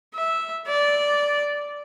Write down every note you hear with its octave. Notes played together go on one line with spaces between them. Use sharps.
E5
D5